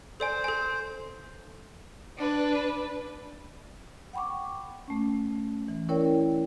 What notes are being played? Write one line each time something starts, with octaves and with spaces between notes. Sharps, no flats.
A4 C5 D5 G#5
A4 G#5
D4 B4
F#5 G5 B5 C#6 D6
A3 C#4
E3
C#4 E4 A#4 C#5 D5 G5